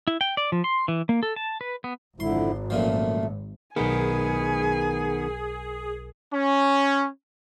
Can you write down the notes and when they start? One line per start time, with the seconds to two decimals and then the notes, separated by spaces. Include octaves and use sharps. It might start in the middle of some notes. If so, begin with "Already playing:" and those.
0.07 E4
0.21 G5
0.37 D5
0.52 F3
0.64 C6
0.88 E3
1.09 A#3
1.23 A4
1.36 A5
1.61 B4
1.84 B3
2.20 G#1 F2 D3 E4 C6
2.70 F#2 A#2 F3 A3
3.76 B1 D#3 B3 G#4 A#4 G#5
6.33 C#4